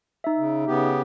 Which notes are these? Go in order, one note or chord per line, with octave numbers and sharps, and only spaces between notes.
D#4 E5
C#3
C#3 B3 G4